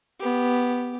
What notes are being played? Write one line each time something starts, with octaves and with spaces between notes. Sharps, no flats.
B3 G4